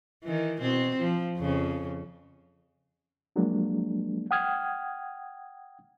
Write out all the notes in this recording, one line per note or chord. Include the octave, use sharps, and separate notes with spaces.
D#3 E3
B2 C4
F3
F2 C#3
F3 F#3 G#3 A#3 D4
F#5 G5 D#6 F6 G#6